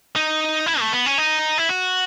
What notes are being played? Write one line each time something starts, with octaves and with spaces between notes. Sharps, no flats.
D#4
E4
A3
B3
C#4
D#4
E4
F#4